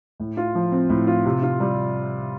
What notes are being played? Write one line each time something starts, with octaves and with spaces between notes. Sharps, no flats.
A2
F4
F3
C4
A2
F4
C3
F4
G3